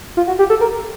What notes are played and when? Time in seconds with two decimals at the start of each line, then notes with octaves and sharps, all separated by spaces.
0.17 F4
0.27 F#4
0.39 G4
0.50 A4
0.61 A#4